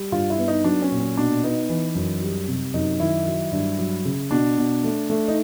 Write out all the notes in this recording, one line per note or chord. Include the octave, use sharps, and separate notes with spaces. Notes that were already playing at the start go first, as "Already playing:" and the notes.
Already playing: G3
G2 F4
E4
B3
D#4
F#3 D4
C#4
A#2
C#4
B2 D4
B3 D#4
E3
F#2
G3
C3
F#2 D#4
D#3 E4
F#3
G2
F#3
C#3
B2 D4
B2
A3
A3
D#4